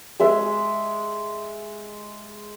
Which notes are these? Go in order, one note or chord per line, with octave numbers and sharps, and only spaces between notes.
G#3 E5